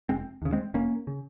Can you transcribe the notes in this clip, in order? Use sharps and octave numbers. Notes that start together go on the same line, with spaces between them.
F1 G#3 C4
D#2 C#3
G#3 C4
F1 A#3 C#4
C#3